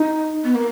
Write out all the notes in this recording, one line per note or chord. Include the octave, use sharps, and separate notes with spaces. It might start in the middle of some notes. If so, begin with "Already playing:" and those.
Already playing: D#4
B3
A#3